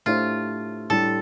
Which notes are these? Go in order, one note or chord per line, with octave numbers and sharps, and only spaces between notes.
A2 A3 D4 F4 G4 C5
A2 G3 D4 G4 A4